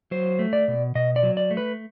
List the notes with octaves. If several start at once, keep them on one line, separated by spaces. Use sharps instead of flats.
F#3 C5
A3
D5
B2
B2 D#5
D5
F#3
D5
A3
B4